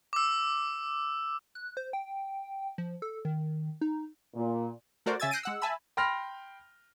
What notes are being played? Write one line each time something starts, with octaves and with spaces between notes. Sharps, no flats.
D6 E6
F#6
C5
G5
F3
A4
D#3
D#4
A#2
A3 F#4 A#4 C5 D5
C#3 E5 G#5 E6 G#6 A6
F#6 G6 A#6 C7 D7 D#7
G#3 F#5 E6
E5 G#5 A5 B5 E6
G5 B5 C6 F6 A#6 F7